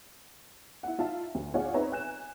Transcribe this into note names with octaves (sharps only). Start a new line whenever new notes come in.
E4 F#5
D#4 F4 E5 A5
D2
F4 G#4 C#5 D5 F#5
C4 D#4 B4 C#5 E5 A#5
G#5 F#6 E7